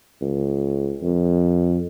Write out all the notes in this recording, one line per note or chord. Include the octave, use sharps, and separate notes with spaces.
C#2
F2